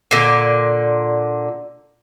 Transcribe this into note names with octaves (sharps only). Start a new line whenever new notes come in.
A#2 D3